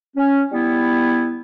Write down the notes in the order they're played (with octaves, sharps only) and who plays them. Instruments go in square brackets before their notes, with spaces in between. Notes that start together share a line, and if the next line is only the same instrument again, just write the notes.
[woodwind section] C#4
G3 B3 E4